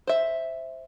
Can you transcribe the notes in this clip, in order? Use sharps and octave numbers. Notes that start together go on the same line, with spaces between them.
C5 E5